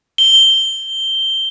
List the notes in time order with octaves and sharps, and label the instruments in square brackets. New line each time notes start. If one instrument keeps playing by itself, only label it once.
[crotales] G7